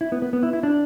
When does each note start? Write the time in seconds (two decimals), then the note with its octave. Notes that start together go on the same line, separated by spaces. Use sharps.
0.01 E4
0.12 B3
0.22 B3
0.33 B3
0.43 E4
0.53 E4
0.63 D4